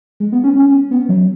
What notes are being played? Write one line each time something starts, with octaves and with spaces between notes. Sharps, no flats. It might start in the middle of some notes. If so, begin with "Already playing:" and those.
G#3
B3
C#4
C#4
B3
F#3